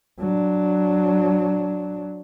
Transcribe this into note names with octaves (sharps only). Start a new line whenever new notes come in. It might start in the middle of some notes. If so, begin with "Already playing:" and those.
F#3 D4